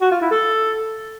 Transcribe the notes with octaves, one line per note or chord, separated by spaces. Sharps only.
F#4
F4
E4
A4